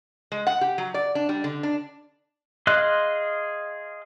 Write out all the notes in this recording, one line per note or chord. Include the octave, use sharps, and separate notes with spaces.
G#3
F#5
G4
F#3
D5
D4
G3
D3
D4
G#4 D#5 F5 C6 F#6